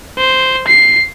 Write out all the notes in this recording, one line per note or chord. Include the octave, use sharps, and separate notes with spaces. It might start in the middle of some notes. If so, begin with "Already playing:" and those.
C5
C7